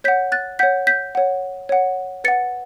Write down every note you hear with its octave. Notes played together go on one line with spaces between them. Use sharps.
C#5 F#5 G6 B6
F#6 A6
C#5 F#5 G6 B6
G6 B6
C#5 F#5
C#5 F#5
B4 F#5 A6 C#7